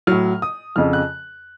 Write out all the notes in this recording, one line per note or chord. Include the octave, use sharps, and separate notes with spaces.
A2 F#3 F6
D#6
F2 C#3 F3 F6
F#6